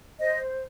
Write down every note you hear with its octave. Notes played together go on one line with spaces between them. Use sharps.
C5 D#5